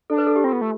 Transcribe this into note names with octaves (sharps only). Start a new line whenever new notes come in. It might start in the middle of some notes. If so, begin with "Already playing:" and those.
D4 A4
B4
A4
G4
C4 F4
B3
A3